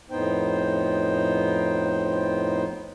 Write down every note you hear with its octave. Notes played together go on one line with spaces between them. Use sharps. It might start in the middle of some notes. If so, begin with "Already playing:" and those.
F2 A2 B3 D#4 C5 G5